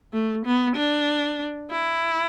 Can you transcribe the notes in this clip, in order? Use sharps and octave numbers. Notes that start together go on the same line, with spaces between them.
A3
B3
D4
E4